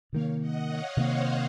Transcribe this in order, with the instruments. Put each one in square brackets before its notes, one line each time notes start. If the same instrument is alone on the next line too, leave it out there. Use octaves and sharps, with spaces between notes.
[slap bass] C3 D#3 A#3 [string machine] C#5 F5
[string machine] D#5 F#5
C#5 F5
[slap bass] C3 D#3 A#3 [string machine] C5 D#5